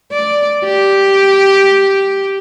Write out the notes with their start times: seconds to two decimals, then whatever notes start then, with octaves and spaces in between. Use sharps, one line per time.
0.11 D5
0.64 G4